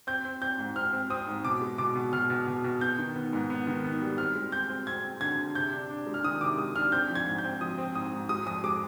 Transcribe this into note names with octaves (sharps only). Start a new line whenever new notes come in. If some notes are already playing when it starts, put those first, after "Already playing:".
C4 G6
C4
C4 G6
G#2
C4 F6
C4
C4 D#6
G#2
B2 D6
G#3
B2 D6
B2
B2 F6
B2
B2
B2
B3 G6
D#3
B3
G#2
B3
D#3
B3
G3
C4 F6
G#3
C4 G6
C4
C4 G#6
C4
D3 G#6
D3
C3 G6
D4
D4
G#3
F6
D#3 D#6
C3 D6
G#3 D#6
D4 F6
C4 G6
F3
G#6
G#2
G6
C4
F3 D#6
C4
G#2 D#6
G#2
G#3 D#6
F2 D#6
G#3 D6